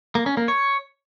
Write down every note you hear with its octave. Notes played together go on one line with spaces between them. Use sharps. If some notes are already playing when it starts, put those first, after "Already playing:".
A#3
C#4
A#3
C#5